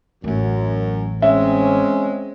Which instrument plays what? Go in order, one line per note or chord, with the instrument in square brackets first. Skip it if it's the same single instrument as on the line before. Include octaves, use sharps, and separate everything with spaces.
[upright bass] A1 A3 [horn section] F#2
[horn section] G#3 C4 C#4 [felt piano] E5